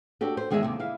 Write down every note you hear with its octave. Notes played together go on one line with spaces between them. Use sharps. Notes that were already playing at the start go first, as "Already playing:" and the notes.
D4 F#4 G4 A4
C5
E2 D#3 G#3 G#4 E5 G#5
D#2 C3
E4 F5